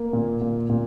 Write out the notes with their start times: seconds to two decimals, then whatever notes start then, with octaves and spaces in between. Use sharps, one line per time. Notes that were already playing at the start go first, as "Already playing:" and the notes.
Already playing: A#3
0.13 A#2
0.41 A#2
0.69 A#2